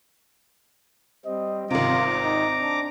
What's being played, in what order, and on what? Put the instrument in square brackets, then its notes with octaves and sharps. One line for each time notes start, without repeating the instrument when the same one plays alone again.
[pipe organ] G3 C4 [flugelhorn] D#5
[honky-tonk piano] G#1 C3 [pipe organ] C4 A#5 D6 [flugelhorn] F4
[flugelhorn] D#4
D4